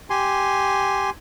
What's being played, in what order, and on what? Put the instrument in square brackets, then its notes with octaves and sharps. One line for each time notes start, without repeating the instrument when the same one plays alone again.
[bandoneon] G4 G#5 C6